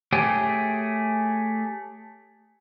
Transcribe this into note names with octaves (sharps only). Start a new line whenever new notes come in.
A3 G4 G#4 C#5 G5